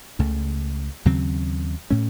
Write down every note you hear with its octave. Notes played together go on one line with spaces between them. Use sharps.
C#2 C#3 A3 C#4
D#2 C#3 F#3 C4
A2 A3 C#4